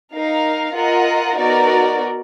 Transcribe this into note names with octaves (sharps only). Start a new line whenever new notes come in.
D#4 A#4 F5
F4 A#4 D#5 F#5
B3 D#4 F#4 A#4 D5